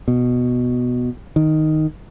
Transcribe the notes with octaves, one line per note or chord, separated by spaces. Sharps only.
B2
D#3